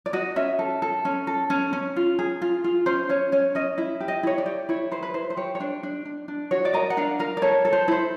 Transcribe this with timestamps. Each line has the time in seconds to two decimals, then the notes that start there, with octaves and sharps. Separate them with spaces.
0.06 D5
0.13 F#4 D#5
0.36 C#4 E5
0.59 A4
0.82 A4
1.05 C#4
1.27 A4
1.50 C#4
1.73 C#4
1.96 F4
2.19 G#4
2.42 F4
2.64 F4
2.86 C#4 C5
3.09 C#4 C#5
3.32 C#4 C#5
3.55 C#4 D#5
3.78 E4 E5
4.01 G4
4.08 D#5
4.23 E4 C#5
4.38 D5
4.46 G4
4.69 E4 C#5
4.91 B4 C5
5.03 B4
5.14 E4 C5
5.30 C5
5.37 G4 C#5
5.55 C#5
5.60 D4 C5
5.83 D4
6.05 D4
6.28 D4
6.51 F#4 C#5
6.65 D5
6.73 A#4 D#5
6.90 F#5
6.97 D4 F5
7.19 A#4 F5
7.37 D5
7.42 A4 C#5
7.65 A4
7.73 C5
7.88 E4 C5